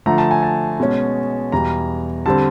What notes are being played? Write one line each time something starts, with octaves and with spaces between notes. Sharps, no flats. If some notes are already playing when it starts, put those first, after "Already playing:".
D3 F3 A3 A#5
A5
G#5
A5
B2 G#3 C#4
E2 B2 G3 A#5
D3 G3 C4 A5